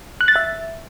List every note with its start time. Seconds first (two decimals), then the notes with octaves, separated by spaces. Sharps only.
0.21 F#6
0.28 A6
0.36 E5